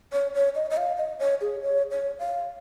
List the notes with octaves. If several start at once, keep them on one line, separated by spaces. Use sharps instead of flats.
C#5
C#5
D#5
D#5
F5
D#5
C#5
G#4
C#5
C#5
F5